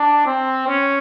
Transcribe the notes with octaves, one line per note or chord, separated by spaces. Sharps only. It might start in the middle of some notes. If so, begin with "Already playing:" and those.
Already playing: D4
C4
C#4